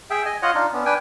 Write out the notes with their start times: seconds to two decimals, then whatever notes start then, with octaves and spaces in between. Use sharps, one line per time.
0.10 G#4 E5 G5
0.25 D#5 G#5
0.42 F4 C#5 D#5 F#5
0.54 D4 D#4 F4
0.73 B3 C#4 D4
0.85 D4 B4 G5 G#5